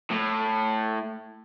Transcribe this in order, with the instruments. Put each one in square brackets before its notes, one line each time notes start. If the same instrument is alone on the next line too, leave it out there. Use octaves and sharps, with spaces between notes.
[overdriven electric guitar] A2